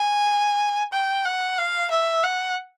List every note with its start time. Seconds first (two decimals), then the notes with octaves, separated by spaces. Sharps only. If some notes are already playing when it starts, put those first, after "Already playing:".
Already playing: G#5
0.92 G5
1.25 F#5
1.58 F5
1.90 E5
2.23 F#5